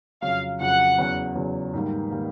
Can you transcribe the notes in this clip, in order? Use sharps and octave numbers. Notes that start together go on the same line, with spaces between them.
F2 C#3 F#3 F5
F2 C#3 F#3 F#5
E2 C#3 F#3
E2 C#3 F#3
G#2 D#3 G3 A#3
D#3 G3 A#3